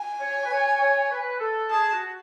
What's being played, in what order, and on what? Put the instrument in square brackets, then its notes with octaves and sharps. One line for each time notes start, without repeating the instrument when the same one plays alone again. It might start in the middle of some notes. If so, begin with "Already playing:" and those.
Already playing: [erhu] G#5
[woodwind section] C#5
B4
C#5
C#5
B4
A4
[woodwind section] G#4 [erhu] A5
[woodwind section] F#4